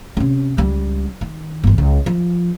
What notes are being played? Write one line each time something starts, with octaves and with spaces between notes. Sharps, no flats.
C3 C#4
C#2 G3
D#3
G1 E3
C#2
F3